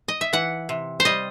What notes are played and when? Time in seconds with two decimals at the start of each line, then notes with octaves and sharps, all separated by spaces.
0.08 D#5
0.21 E5
0.33 E3 F#5
0.69 C3
1.00 C5
1.05 G3 D#5